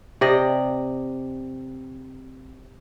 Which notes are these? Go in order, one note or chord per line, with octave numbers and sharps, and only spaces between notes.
C3 D5 D#5